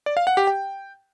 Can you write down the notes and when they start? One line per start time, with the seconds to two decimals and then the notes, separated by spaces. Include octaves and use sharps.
0.06 D5
0.17 F5
0.27 F#5
0.37 G4
0.47 G5